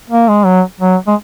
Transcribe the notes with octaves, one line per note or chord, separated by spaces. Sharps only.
A#3
G#3
F#3
F#3
G#3